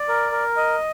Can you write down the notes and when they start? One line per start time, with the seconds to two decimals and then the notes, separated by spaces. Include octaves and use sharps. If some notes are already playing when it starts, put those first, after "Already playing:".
Already playing: D5
0.08 A#4
0.32 A#4
0.57 D#5